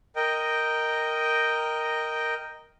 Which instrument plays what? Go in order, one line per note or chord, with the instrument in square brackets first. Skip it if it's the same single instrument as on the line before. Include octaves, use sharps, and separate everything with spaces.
[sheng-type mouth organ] A#4 D#5 G5